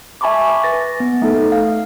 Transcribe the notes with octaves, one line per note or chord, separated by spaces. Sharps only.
E5 G#5 A5 B5 C#6 D6
B4 A6 A#6
B3
A3 D#4 A4
F5